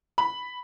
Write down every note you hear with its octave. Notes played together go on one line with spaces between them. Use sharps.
B5